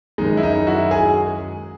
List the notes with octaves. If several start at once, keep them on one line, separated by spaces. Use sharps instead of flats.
F#2 D#3 G#3 D#4
E4
D#4
E4 F#4
G#4